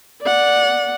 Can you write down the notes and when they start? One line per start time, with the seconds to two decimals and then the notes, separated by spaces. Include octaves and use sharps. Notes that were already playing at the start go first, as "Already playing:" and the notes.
0.22 D5 F#5